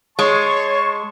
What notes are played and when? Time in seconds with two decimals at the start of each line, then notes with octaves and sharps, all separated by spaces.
0.19 G#3 C#5 A5 C6 C#6